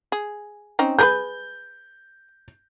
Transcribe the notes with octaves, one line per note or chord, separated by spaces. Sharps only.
G#4
C4 C#4 D#4
G#4 A#4 B4 G6